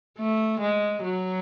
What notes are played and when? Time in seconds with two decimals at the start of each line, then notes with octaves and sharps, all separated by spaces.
0.18 A3
0.61 G#3
1.03 F#3